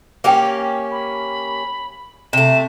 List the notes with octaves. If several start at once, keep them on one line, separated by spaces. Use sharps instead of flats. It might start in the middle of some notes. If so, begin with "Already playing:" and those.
A#3 C#4 G4 F5 G5
B5
C3 A3 E7